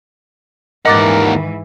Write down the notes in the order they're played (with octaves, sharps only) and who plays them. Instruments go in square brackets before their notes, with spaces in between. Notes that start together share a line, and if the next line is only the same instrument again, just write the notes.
[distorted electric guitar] D#2 F#5 [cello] G#2 E3 [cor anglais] A#4 [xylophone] D#5 D6 A6